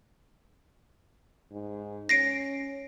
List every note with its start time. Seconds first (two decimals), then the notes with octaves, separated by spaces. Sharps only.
1.52 G#2
2.09 C#4 A#6 C7 D7